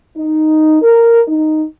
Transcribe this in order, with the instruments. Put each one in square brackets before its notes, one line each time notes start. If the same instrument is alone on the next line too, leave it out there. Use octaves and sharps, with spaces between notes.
[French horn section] D#4
A#4
D#4